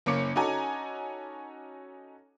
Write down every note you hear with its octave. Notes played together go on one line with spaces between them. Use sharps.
F#1 A#3 C#4 D6 C#7
C#4 D#4 F#4 A4 G#5 A#5